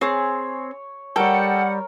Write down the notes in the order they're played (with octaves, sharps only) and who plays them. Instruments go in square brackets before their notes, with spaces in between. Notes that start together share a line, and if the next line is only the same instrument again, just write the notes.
[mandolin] C4 G#4 [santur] C#5
[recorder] G3 [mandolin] A4 G5 [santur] A#4 C#5 [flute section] F#5